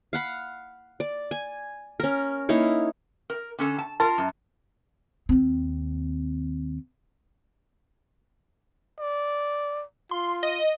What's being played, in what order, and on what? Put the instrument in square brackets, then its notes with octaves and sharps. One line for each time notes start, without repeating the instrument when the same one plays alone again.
[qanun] F5 F#5 B5
D5
G#5
C#4 A#4
A#3 D#4 E4 C#5
[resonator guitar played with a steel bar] A#4
D3 C#4 A4
A5
[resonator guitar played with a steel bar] F4 A#4 [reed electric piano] A5
[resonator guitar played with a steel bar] F#2
[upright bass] D#2 C4
[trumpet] D5
[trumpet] F4 [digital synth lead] C6
[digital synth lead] D#5